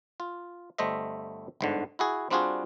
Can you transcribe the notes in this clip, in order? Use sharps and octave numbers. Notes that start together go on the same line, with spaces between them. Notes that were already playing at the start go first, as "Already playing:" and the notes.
F4
G1 G3 A3 C5 D#5 E5
G1 G#2 D3
E4 F#4 G#4
G3 C4 D4 F4 F#4 G#4